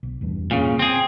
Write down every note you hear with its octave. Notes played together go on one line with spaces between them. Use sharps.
B1
F1 E2 G2
A#2 C#3
C4 G#4